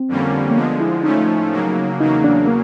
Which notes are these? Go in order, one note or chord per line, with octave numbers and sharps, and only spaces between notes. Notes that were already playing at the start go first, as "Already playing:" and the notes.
Already playing: C4
F2 D3 G3 A#3 C#4
A#3
D3 F3 G#3 B3
E4
A2 F3 A3 C#4 D#4
C#3 F#3 A#3
E2 C#3 F#3 A#3 D#4
D4
A#3